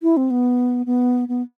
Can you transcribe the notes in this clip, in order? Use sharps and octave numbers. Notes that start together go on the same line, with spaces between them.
E4
C4
B3
B3
B3